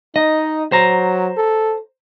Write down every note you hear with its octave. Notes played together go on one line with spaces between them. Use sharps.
D#4 D#5
F#3 C5 A#5
A4